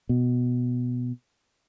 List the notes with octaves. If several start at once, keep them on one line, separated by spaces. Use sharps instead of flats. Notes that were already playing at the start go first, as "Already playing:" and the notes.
B2